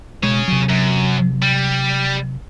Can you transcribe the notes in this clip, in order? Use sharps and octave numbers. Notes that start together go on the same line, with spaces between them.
B2 G#3 G#4 C#5
C3 F#3
F#2
G3